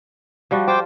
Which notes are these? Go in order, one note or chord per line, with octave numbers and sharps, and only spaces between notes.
F3 G3 F#4
F4 C5 G5 D6